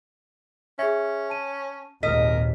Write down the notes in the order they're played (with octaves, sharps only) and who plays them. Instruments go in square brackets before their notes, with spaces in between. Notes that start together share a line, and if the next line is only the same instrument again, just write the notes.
[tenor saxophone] C#4 [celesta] G#4 E5
[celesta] A5 D#7
[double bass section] G#1 D#2 A#2 [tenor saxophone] A#4 [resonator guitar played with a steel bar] D#5 [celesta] B6